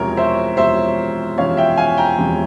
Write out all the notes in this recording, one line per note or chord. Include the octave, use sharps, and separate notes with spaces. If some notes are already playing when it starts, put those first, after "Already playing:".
Already playing: E1 E2 C3 F3 A#4 C#5
C5 E5
E1 E2 C3 F3 C5 E5
E1 E2 C3 F3 C#5 F5
E5 G5
F5 G#5
G5 A#5
E1 E2 C3 F3